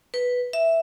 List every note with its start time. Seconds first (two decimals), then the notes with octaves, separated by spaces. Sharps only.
0.14 B4
0.53 E5